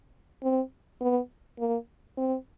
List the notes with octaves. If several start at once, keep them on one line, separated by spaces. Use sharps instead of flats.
C4
B3
A#3
C4